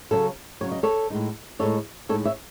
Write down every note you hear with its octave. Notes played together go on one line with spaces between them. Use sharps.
C#3 F#3 C#4 A4 C#5
C#3 F#3 C#4 C#5
D#5
A4 C#5
A2 G#3 D#4
A2 G#3 D#4 A4 C#5
A2 G#3 D#4 A4 C#5
C#5 E5